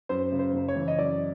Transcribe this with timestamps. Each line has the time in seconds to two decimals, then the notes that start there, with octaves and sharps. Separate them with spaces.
0.09 F#2 C5
0.32 C#3
0.39 C5
0.54 F#1
0.68 C#5
0.76 E3
0.88 D#5
0.98 F#2 D5